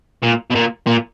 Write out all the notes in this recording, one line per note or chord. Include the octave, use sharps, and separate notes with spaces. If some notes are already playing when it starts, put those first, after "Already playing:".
A#2
B2
A#2
A#2